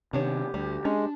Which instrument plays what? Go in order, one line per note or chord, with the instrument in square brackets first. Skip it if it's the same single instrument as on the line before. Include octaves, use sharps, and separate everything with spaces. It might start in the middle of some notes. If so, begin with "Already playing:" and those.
[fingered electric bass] C3 D#3 [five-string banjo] B3 D4 C#5 [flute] G4
[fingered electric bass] D2 [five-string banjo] G3
[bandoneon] G#3 [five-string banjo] C#4 G#4 [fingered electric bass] D4